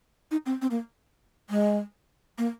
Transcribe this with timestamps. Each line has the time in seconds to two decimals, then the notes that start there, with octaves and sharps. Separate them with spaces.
0.31 D#4
0.46 C4
0.62 C4
0.71 A#3
1.50 G#3
2.38 A#3